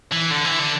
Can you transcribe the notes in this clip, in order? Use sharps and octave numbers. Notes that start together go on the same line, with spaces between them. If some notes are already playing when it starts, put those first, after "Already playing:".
E3
D3
E3
D3